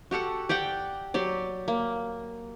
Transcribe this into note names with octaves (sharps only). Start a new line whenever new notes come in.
F#4 G4 A4 F#5
G4 D5 F#5 G5
F#3 G4 D5
A#3